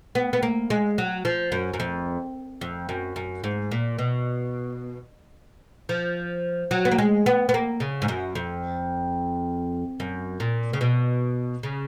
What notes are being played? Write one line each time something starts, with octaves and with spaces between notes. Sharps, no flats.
B3
B3
A#3
G#3
F#3
F3
F#2
F#2
F2
F2
F#2
F#2
G#2
A#2
B2
F3
F#3
B3
A#3
G#3
B3
B3
A#3
C#3
G#2
F#2
F2
F#2
A#2
C#3
B2
C#3